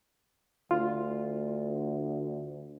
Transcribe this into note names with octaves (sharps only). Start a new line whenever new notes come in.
D2 F4